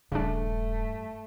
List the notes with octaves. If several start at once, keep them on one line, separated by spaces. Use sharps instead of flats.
D#1 G2 C#3 A3 D4